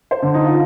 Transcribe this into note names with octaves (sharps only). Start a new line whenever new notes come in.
C5
D3
D#4
F4